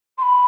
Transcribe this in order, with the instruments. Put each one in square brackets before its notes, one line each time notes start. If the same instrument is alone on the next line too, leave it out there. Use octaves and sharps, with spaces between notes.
[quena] C6
B5